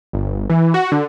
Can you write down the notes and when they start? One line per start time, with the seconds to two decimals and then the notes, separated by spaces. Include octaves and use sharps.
0.13 G1
0.50 E3
0.74 F#4
0.92 D3